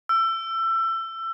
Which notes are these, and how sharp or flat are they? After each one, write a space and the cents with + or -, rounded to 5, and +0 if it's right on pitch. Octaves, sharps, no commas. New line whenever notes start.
E6 +25